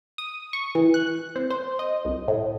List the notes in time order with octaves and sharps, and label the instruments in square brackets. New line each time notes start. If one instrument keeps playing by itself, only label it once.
[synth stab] D#6
C#6
E3
F#6
C4
C5
D#5
C2
A2